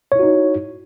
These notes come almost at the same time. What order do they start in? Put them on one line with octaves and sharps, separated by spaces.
C#5 E4 F#4 D#4